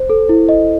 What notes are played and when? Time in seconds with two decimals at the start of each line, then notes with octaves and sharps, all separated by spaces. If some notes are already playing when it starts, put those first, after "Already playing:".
Already playing: C5
0.10 A4
0.29 E4
0.49 D#5